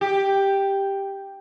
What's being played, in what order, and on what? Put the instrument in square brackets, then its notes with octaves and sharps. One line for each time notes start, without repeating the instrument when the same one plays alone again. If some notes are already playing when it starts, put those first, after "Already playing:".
[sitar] G4